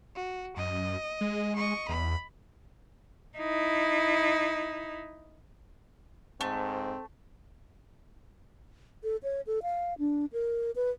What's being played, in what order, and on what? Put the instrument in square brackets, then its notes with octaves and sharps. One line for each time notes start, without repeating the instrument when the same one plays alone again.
[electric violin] F#4
[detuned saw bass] F#2 [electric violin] D#5
[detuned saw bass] G#3
[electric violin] D#5 C#6
[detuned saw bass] E2 [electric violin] B5
[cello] D#4 E4
[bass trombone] G#2 [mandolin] A3 [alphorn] C4
[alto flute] A4
C#5
A4
F5
D4
A#4
B4